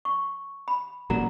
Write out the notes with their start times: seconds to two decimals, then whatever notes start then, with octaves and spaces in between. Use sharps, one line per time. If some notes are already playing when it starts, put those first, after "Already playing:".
0.05 C#6
0.68 B5
1.10 A1 A#2 F#3 A#5